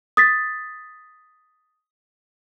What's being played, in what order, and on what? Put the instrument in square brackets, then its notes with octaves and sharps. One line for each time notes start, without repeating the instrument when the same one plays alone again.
[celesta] D#6 A6 B6